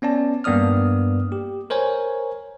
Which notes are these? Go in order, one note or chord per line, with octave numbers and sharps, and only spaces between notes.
B3 C#4 D5 A5
G2 A#3 B3 D5 D#6 F6
G4
A#4 C5 C#5 G#5